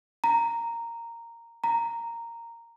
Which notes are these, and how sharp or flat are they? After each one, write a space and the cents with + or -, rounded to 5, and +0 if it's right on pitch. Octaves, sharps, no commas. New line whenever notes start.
A#5 -5
A#5 -5